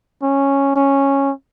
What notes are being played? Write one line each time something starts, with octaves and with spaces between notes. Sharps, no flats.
C#4
C#4